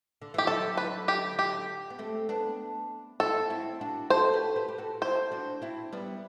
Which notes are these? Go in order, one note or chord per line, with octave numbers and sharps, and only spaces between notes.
D3
E3 G4
D3 F#3 A4
B4
G4
D3 F#3 G4
B3
A3 C4
B3 D4
C4 E4 A4
C4 E4
D4 F#4
F#4 A4 C5
G4 B4
G4 B4
G4
F#4 A4
E4 G4 C5
D4 F#4
C4 E4
G3 B3